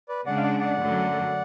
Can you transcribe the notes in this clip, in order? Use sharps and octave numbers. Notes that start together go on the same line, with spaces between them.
B4 D5
C#3 G#3 D4 D5 F#5
F5
D5 F#5
D5 F#5
F#2 D3 F#3 A3